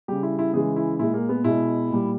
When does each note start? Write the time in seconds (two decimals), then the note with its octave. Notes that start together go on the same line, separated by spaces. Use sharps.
0.08 C#3 G3 G4
0.23 E4
0.39 E4
0.53 C#3 E3 G#3 G#4
0.76 E4
0.99 A#2 G#3 E4
1.14 A#3
1.29 B3
1.44 B2 G#3 E4
1.90 A#2 G3